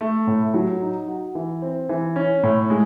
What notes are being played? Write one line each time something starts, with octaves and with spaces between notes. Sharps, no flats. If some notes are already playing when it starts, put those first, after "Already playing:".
A3
A2
F#3
D#4
F#4
E3
C4
E3
C#4
A2
G#3